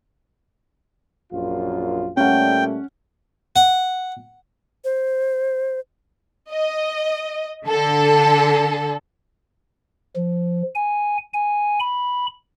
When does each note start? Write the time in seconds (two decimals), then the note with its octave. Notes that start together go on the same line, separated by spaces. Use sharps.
1.33 A#1 F#2 F4
2.17 A#2 G3 A3 C#4 F#5 G5
3.56 F#5
4.84 C5
6.53 D#5
7.68 D3 A4
10.16 F3
10.75 G#5
11.33 G#5
11.80 B5